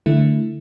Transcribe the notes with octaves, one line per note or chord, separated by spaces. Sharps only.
D3 A3 E4